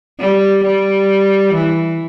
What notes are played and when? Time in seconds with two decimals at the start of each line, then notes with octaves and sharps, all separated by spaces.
0.20 G3
0.64 G3
1.54 E3